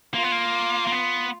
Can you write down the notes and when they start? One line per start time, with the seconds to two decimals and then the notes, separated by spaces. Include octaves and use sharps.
0.14 A#3 F4
0.23 B3
0.32 A#3
0.87 A#3
0.92 B3